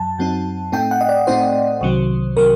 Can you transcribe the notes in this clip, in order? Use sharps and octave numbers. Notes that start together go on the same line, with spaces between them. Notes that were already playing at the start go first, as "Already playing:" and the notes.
Already playing: F#2 F#3 A5
F#2 F#3 C4 D#4
A2 A3 C4 D#4 G5
F#5
D#5
D5
A2 A3 C4 D#4 C5
C2 C3 D#3 F#3
C3 D#3 F#3 A#4